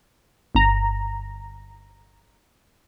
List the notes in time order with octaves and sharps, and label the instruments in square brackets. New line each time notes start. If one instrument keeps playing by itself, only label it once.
[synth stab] G1 A#5